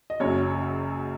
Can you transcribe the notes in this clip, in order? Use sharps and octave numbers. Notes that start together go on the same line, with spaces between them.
D#5
F#1 F#2 C#3 C#5